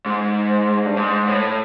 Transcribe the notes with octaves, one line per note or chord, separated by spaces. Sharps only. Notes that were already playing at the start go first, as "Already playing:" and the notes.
G#2
G2
G#2
A2